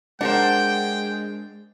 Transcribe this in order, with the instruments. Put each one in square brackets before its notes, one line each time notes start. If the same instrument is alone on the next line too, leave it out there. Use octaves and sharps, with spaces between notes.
[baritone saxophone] G#3 [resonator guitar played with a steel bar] D4 A#4 C5 [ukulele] F#5 [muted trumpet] G5